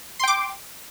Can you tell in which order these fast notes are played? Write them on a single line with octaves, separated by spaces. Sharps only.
C6 G5 D6